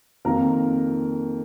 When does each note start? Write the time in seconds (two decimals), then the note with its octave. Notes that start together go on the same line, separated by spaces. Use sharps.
0.25 F2 D#3 A#3 F4 A#4 A#5